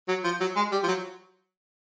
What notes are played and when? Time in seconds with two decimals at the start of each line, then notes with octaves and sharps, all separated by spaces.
0.09 F#3
0.24 F3
0.41 F#3
0.56 G#3
0.72 G3
0.84 F3
0.88 F#3